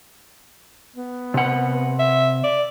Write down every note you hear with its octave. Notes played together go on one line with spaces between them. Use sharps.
B3
C3 F#5
E5
D5